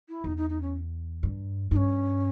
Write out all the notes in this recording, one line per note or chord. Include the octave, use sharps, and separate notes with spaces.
E4
E2 D#4
D#4
D#4
C#4
G2
G2 C#4 D#4